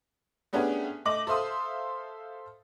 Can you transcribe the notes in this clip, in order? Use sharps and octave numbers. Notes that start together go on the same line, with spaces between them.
A3 B3 C#4 D4 G4 G#4
A3 D#5 D6 F#7
A4 C5 E5 F5 C6 D#6